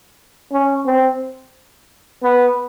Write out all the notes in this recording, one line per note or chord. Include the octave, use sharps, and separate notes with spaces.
C#4
C4
B3